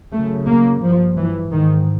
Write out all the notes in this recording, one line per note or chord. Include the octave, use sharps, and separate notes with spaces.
F#2 C#3 A3
A#3
G2 F3
E3
G#2 D#3